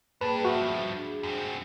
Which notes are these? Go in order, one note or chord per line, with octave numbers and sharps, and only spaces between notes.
G2 A#3 D4 G#4 B4 G5 A5
G2 F3 F#4 E5
D4 G#4
F#2 C4